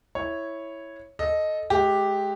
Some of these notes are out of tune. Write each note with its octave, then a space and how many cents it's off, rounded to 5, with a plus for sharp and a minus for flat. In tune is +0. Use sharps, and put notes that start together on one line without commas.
E4 +0 C#5 -5
A4 -15 D#5 +0
G#3 +30 G4 +0